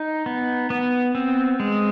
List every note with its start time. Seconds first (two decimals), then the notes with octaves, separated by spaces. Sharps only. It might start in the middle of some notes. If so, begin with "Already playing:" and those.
Already playing: D#4
0.26 B3
0.70 B3
1.15 C4
1.60 G#3